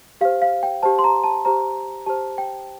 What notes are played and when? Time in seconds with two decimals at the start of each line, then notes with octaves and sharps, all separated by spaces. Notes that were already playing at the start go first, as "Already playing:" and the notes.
0.21 G4 C5 F5
0.42 F5
0.63 G5
0.83 G4 C5 A5
0.99 C6
1.04 A#5
1.24 A5
1.45 G4 C5 A#5
2.06 G4 C5 A5
2.38 G5